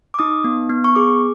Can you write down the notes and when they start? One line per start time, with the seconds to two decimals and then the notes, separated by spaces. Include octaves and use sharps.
0.14 D6
0.19 D#4 D#6
0.44 B3
0.70 B3
0.84 C#6
0.95 G#4 D6